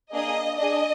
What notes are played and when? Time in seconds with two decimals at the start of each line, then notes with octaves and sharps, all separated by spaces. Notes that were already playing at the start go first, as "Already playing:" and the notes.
0.12 A#3 D4 G#4 D#5
0.57 D4 G#4 D#5